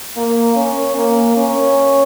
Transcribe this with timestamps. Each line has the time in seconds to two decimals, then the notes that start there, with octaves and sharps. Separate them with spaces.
0.17 A#3
0.56 C#4
0.96 A#3
1.36 C#4